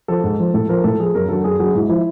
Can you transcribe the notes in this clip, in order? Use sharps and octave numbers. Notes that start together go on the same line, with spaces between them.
F3 A4
G#2
F3
A2 A4
F3 A#4
A2 A4
F3 G#4
F#2 A#4
D3 F#3 A4
F#2 G#4
D3 F#3 G#4
G#2 E4
F3 E4